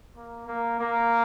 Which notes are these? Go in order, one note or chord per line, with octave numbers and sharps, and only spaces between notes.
A#3
A#3
A#3